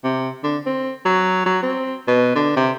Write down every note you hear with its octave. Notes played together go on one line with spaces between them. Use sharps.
C3
D3
C4
F#3
F#3
C4
B2
D3
C3